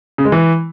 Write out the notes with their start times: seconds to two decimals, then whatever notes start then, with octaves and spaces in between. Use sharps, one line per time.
0.18 C#3
0.25 G#3
0.32 E3